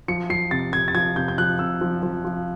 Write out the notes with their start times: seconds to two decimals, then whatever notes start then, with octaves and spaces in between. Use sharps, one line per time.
0.08 F3 C#7
0.30 F3 C7
0.51 C3 A6
0.73 C3 G#6
0.88 A6
0.95 F3 G#6
1.16 C3 G6
1.28 G6
1.38 F3 F#6
1.59 C3 E6
1.81 F3
2.03 F3
2.25 F3